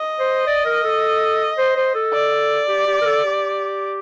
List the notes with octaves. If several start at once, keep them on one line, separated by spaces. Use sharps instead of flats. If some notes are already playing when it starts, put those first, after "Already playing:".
Already playing: D#5
C5
D5
A#4
A4
C5
C5
A4
D5
G4
G4
A#4
A4
G4